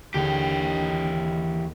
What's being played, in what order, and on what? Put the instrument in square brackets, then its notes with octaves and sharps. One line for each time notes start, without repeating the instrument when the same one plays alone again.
[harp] D#2 D3 G#4 [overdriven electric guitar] E3 G4
[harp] D#5